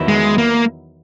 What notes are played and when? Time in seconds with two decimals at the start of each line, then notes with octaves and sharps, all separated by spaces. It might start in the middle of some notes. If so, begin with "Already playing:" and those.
Already playing: E2 D#3 F#3 B3 E4
0.08 G#3
0.38 A#3